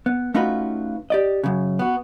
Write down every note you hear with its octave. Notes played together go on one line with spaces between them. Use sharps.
B3
A3 C#4 D#4 F4 F#4 B4
G4 D5 D#5
F#2 C#3
B3 F#4